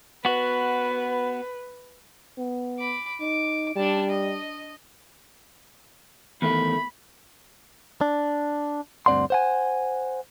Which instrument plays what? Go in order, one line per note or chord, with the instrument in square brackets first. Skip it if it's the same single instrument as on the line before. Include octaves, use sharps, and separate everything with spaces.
[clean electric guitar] B3 F#4 [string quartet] B4
[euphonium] B3
[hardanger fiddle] B5 D6
[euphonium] D#4 [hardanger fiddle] D6
[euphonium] G3 [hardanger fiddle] D4 A5
[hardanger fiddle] D#5
[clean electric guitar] E2 D#3 A3 [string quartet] B5
[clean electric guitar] D4
D2 G2 C4 D5 F#5 C6
C5 F#5 G#5